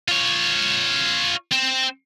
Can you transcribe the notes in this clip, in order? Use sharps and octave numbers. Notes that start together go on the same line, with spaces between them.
F4 C#5
C4